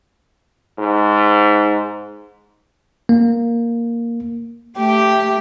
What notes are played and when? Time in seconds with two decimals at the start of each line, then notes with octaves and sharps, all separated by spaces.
0.78 G#2
3.09 A#3
4.78 A3 G4